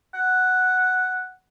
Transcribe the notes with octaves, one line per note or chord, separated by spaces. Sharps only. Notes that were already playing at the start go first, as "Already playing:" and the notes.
F#5